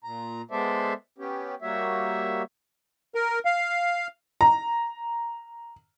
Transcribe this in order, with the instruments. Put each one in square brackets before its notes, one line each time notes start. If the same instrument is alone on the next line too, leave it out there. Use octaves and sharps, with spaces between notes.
[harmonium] A#2 A#5
G#3 B3 A4 C5 D5 E5
B3 C#4 G4
G3 A#3 F#4 C#5 E5
[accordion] A#4
F5
[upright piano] A#5